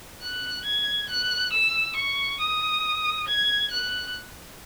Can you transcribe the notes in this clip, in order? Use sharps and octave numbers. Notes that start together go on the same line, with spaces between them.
F#6
G#6
F#6
E6
C#6
D#6
G#6
F#6